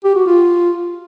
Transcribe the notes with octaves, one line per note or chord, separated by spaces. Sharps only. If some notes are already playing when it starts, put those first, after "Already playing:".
G4
F#4
F4